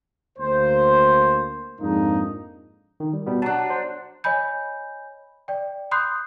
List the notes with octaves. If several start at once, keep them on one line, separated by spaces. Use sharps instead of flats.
D2 A#3 C5
F2 G#2 G#3 A#3 D4 D#4
D#3
G3
B2 G3 B3
F#3 D4 A5
C5
C#5 D#5 G#5 B5 G6
D5 G5
B5 C6 D#6 F#6 G6 C7